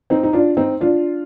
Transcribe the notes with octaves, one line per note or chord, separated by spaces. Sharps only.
C4 D#4
D#4
D4 F4
C4 D#4
D4 F4